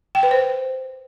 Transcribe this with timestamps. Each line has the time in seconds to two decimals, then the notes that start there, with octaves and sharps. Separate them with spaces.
0.15 G5
0.23 B4
0.31 C5